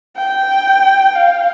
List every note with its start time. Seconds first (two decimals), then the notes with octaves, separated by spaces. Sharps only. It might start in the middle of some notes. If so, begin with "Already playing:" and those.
0.17 G5
1.16 F5